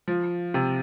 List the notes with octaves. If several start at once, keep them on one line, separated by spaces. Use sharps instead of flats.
F3
C3